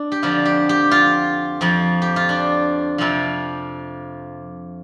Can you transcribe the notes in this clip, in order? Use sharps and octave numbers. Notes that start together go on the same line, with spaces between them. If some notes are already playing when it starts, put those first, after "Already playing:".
Already playing: D4
G4
F2 D3 F3 F4
G4
G4
F4
F2 F3
G4
F4
D4
F2 C3 F3